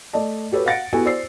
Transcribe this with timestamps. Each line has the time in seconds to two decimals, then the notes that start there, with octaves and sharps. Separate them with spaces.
0.13 A3 D5 D#5 A5
0.52 F#4 G4 A4 B4 C#5
0.66 F5 F#5 A6 A#6 C#7 D7
0.93 B3 E4 F#4 G4 A4 G#5
1.06 C5 D5 E6 C7